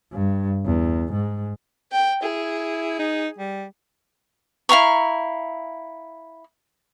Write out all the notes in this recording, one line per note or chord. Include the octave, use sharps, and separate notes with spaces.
G2
E2
G#2
G5
E4 G#4
D#4
G3
E4 F5 A#5 C#6